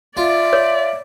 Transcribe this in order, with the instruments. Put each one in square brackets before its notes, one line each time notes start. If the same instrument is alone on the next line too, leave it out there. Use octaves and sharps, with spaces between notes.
[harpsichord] F4 [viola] D5 [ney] E5
[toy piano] C#5